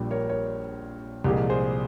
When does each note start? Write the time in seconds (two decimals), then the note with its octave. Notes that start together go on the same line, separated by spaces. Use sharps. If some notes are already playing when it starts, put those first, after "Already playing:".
Already playing: A#1 A#2 G3
0.11 A#4 C#5
0.29 A#4 C#5
1.24 C2 A#2 F3 G#3 G4 A#4
1.50 G#4 C5